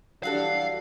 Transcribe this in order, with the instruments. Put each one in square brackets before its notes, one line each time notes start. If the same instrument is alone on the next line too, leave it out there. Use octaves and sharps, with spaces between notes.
[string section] E3 G3 D4 [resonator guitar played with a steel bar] F#3 F#4 A4 [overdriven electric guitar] F5